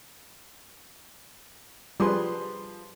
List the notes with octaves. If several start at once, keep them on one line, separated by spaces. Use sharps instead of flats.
F3 G3 G#4 B4 C6